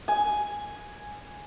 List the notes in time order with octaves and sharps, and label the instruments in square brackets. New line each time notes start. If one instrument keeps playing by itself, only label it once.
[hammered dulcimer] G#5